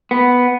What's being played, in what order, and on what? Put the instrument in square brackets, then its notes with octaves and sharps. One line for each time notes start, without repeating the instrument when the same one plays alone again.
[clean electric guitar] B3